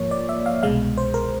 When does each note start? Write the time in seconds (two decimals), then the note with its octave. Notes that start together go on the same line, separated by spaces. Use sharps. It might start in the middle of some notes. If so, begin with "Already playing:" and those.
Already playing: G#2 F3 A#3 C#5
0.11 D5
0.29 E5
0.46 F5
0.63 C2 B2 G#3 F5
0.97 C5
1.14 A#4